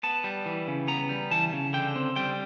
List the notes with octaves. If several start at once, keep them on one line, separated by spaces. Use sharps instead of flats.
B3 A5
G3
E3
C#3
B3 A#5
G3
E3 A5
C#3
D3 G5
C4
G3 G5